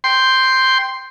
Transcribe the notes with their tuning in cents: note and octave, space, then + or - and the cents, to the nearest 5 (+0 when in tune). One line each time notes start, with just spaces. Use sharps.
G5 +0 C6 +0